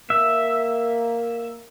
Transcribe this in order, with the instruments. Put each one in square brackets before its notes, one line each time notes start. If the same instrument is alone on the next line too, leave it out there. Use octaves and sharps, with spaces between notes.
[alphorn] A#3 [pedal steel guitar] E5